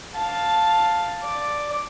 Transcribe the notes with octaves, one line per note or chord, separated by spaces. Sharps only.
F5 A5
D5